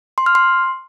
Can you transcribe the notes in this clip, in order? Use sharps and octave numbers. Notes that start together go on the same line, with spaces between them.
C6
F6
C6